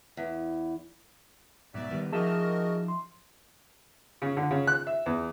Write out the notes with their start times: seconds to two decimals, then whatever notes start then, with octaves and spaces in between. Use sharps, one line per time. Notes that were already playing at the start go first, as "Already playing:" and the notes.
0.17 E2
1.74 G#2 B2 F#3 D5 E5
1.91 D#3 G3 B3
2.13 F3 D#4 F#4 G#4 A#4 D#5 E5 A5
2.88 C6
4.22 C#3
4.37 D3
4.51 C#3
4.67 F#6
4.87 E5
5.06 E2